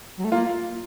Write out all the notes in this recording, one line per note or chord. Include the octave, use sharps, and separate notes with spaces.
F#3
A3
A#3 F4